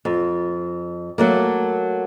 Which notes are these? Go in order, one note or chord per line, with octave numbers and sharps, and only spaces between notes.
F2
F#3 A3 A#3